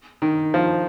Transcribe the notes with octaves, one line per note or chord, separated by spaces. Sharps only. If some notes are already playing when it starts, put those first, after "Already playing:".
D#3
F3